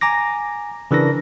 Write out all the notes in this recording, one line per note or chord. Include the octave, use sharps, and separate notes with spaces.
G#5 A#5 D6 A#6
C#3 E3 D4 A#4 A#6